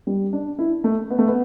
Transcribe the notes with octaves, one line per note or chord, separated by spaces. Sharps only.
G3
D4
E4
A3
B3
A3
B3